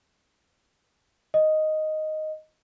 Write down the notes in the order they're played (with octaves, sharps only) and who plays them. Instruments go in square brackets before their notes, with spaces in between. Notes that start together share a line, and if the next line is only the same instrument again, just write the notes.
[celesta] D#5